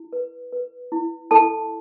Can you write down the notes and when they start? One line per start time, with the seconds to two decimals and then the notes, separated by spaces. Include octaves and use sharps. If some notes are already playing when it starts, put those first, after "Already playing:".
Already playing: E4
0.13 B4
0.52 B4
0.92 E4
1.31 E4 A4 A5